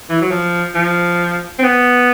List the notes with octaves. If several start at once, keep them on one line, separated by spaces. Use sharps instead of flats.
E3
F#3
F3
F3
C4
B3